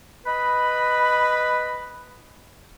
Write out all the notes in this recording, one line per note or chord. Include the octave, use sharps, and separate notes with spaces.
B4 D#5 B5